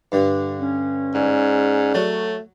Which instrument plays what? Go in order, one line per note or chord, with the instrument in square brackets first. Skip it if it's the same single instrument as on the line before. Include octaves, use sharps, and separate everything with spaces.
[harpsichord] G2 D3
[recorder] C#4
[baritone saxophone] G#2 [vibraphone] G#4 D5
[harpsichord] F#3 [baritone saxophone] A3